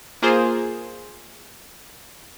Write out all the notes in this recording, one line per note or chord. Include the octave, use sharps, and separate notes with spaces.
A#3 F4 G#4 C5